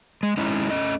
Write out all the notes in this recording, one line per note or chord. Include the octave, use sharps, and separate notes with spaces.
G#3
G#3 C#4 D#4 E4
A3 C#4 D#5